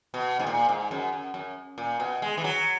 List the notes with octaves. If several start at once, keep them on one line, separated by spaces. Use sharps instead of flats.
B2
G#2
A#2
G#2
F#2
F#2
F#2
A#2
B2
G#3
E3
F#3